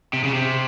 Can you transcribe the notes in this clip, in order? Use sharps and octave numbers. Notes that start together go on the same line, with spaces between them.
C3
C#3
C3